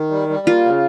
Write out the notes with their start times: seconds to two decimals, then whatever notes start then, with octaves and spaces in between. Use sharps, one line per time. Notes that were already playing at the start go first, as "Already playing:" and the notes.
Already playing: D#3
0.10 G3
0.29 G3
0.47 A#3 F4
0.65 C#3